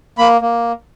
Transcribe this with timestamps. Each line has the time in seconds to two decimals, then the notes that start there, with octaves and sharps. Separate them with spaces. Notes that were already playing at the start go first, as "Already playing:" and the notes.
0.18 A#3 B5
0.41 A#3